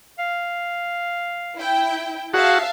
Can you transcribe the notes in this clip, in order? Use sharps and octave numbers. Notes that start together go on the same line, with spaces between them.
F5
E4 G5
F#4 G#4 E5 F5 A5